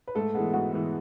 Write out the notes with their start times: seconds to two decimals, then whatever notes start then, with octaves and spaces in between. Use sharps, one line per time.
0.08 B4
0.15 G#2 A3 A4
0.35 E3 G#3 B3
0.53 G#2 F#4
0.72 E3 G#3 B3